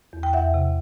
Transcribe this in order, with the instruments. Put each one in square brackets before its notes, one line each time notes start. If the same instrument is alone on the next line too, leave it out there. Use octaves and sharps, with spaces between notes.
[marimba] E2
G5
E2 E5 F#5
C3